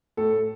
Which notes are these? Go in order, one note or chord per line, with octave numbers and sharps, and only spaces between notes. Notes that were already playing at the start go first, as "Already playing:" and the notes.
A2 A4